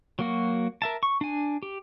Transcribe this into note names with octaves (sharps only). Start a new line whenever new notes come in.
F#3 A#3 F#4
A#4 E5 A5
C#6
D4 G#5
G4